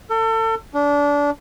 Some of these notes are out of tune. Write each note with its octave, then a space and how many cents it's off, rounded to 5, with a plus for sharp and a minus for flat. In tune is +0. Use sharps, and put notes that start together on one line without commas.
A4 +35
D4 -25